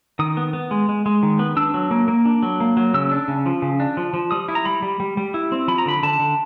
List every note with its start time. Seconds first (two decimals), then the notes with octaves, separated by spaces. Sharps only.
0.19 D#3 D#6
0.37 B3
0.53 B3
0.71 G#3
0.89 G#3
1.06 G#3
1.23 D#3
1.39 B3
1.57 D4 E6
1.74 F#3
1.91 A#3
2.08 A#3
2.25 D4
2.43 F#3
2.60 A#3
2.77 F#3
2.94 C#3 E6
3.12 D4
3.28 C#3
3.46 F3
3.62 C#3
3.80 D4
3.97 F3
4.14 F3
4.31 G3 D#6
4.48 E4
4.55 A#5
4.65 G3 B5
4.82 G3
5.00 G3
5.17 G3
5.34 E4
5.52 C4
5.68 F3 B5
5.78 A#5
5.86 D3 B5
6.03 D3 A5
6.20 D3